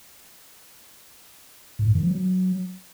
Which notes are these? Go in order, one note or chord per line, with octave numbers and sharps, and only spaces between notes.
A2
F#2
D#3
F3
F#3